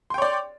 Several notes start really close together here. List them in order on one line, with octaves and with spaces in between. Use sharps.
C6 G5 C#5 D5